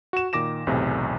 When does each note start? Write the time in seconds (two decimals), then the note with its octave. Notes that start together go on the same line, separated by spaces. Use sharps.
0.13 F#4 E7
0.33 A#2 D#3 D6 A#6 E7
0.67 B1 E2 A2 C3